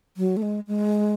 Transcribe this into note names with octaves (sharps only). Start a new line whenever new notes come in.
F#3
A3
G#3
G#3